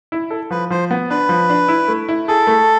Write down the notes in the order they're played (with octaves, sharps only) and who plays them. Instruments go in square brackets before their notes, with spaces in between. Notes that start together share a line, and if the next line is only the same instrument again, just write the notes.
[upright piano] E4
A4
[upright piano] F3 [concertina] B4
[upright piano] F3 [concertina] C5
[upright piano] B3
[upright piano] D4 [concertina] B4
[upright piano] F3
D4
E4
A3
E4
[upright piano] G#4 [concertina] A4
[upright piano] A3